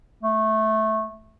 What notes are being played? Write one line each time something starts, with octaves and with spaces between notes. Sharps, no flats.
A3